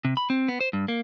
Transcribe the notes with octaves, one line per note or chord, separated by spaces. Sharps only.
C3
B5
C4
B3
C5
G2
A#3